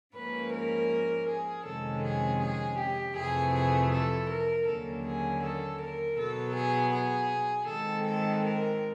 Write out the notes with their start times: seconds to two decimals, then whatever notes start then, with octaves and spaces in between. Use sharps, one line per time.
0.15 G#2 F3 A#3 C#4 B4
0.52 A#4
1.28 G#4
1.65 F2 C3 D#3 G#3 C#4 A4
2.03 G#4
2.41 G#4
2.78 G4
3.16 F2 C3 E3 A3 G#4
3.54 G#4
3.92 A4
4.29 A#4
4.67 D#2 D3 F#3 A#3 C#4 A4
5.05 G#4
5.42 A4
5.80 A#4
6.17 B2 F#3 B3 A4
6.55 G#4
6.93 G#4
7.68 G#2 D#3 G#3 C4 A4
8.06 A4
8.44 A#4